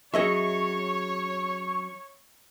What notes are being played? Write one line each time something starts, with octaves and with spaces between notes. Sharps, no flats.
F#3 C#4 G#4 C#5 D#5 E5 C#6